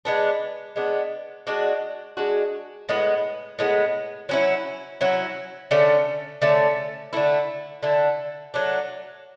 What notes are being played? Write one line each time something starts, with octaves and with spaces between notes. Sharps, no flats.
G#3 B3 D4
G#3 B3 D4
G#3 D4 F#4
G#3 D4 F#4
A2 G#3 B3
A2 G#3 B3
F#3 C#4 E4
F#3 C#4 E4
D3 A3 C#4
D3 A3 C#4
D3 A3 E4
D3 A3 E4
F#3 A3 D4